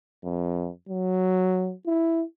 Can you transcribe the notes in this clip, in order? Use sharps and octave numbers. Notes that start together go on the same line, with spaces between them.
F2
F#3
E4